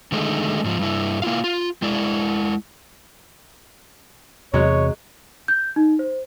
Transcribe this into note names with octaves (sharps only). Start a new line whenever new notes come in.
D3 D#3 G#3 A3 D#4
G#2 F3
G2 E4
A#3 E4 F4 F5
F4
G#3 E4 D5
E2 C3 F#3 G#3 C#4 C#5
G6
D#4
C5